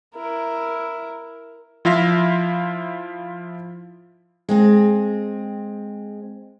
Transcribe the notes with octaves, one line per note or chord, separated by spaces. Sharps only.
E4 A#4
F3 E4 F4 E5 F5 A#6
G#3 C4 G#4